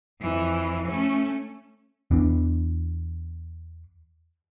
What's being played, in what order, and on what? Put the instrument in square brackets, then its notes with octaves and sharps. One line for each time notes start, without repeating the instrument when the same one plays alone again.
[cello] F2 E3
A3 C#4
[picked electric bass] E2 E3 B3 D4